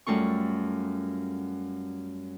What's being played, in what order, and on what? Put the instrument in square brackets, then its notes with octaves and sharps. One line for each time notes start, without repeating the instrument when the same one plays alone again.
[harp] F#2 G3 A3 F4 C#6